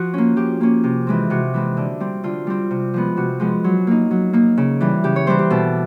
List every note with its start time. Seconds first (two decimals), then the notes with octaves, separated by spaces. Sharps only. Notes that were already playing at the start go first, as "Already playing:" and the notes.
Already playing: F3 F#4
0.13 A#3 C#4
0.37 F3 G4
0.61 A#3 C#4
0.84 C3
1.07 E3 G#3 C4
1.30 C3 F#4
1.54 E3 G#3 C4
1.77 D3
2.00 G3 C4
2.23 D3 F4
2.47 G3 C4
2.71 C3
2.94 F3 G#3 B3
3.17 C3 F#4
3.40 F3 G#3 B3
3.64 F#3
3.87 A#3 D#4
4.11 F#3
4.33 A#3 D#4
4.57 C#3
4.80 E3 G3
5.04 C#3 G4
5.16 C#5
5.27 E3 G3 C5
5.39 G4
5.50 B2 A4